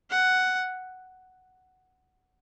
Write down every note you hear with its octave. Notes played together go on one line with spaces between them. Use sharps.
F#5